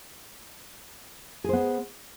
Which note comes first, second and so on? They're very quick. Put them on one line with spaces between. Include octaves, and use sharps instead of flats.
G#4 C5 B3